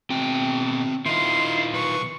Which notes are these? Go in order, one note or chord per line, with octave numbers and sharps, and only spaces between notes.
B2 C4 F#4 G5
D#3 E4 F4 D#5 C6
B1 B4 C#6